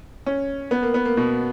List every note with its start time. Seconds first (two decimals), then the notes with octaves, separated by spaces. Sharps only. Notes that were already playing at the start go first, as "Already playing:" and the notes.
0.26 C#4
0.71 B3
0.82 A#3
0.94 B3
1.05 A#3
1.17 B2